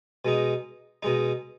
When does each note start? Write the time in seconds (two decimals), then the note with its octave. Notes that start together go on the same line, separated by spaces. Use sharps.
0.25 B2 G#3 D#4
1.03 B2 G#3 D#4